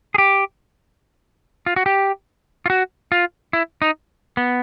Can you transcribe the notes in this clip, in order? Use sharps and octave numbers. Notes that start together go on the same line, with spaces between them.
G#4
G4
F4
F#4
G4
F4
F#4
F4
E4
D#4
B3